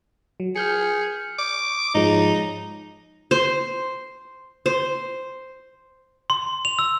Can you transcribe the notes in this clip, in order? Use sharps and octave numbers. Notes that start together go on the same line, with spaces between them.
F#3
G#4 F6 G6 C#7
D6
G#2 F3 G#3 D#4
C5
C5
C6
F7
E6